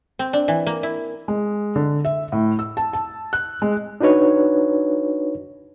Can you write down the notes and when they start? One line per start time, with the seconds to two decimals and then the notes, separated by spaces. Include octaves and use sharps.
0.19 C4
0.33 D4
0.48 E3
0.67 A#3
0.83 E4
1.28 G#3
1.76 D3
2.05 E5
2.32 A2
2.59 E6
2.77 A5
2.93 A5
3.33 F#6
3.62 G#3
4.01 D4 D#4 F#4 B4 C#5